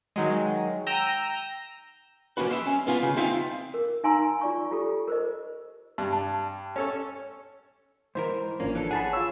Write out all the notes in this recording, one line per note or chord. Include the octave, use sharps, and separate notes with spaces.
D#3 F#3 G#3
G5 A#5 E6 G6 A#6 D#7
F3 A3 A#3 C#4 F#4 B4
E5 C6
C#4
B3 F4 G#5
C#3
C4 D#4 F4 E5 F5
A#4
D#4 F5 G#5 A#5 C6 E6
F4 D5 C#6
F4 G4 A4
A#4 C5 D#5
G2
A5
C#4 A4 C#5
G#2 E3 A#4 C5
G#1 F3 A#3 C#4 D4
E3 A4
G#4 F#5 A5 B5
F4 C#5 E6